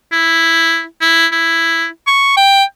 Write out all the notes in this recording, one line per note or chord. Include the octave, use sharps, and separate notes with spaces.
E4
E4
E4
C#6
G5